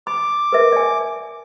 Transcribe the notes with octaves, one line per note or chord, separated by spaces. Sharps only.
B5 D6
A#4 B4 E5
D5 G#5